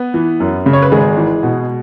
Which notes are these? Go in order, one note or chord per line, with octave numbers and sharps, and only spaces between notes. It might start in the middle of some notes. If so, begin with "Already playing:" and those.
Already playing: B3 B4
E3
F#2
C#3
C#5
B4
G#1 G#3 G#4
E3
B2